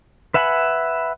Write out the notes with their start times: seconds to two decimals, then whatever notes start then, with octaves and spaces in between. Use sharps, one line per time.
0.34 B4 E5 F#5 G#5 B5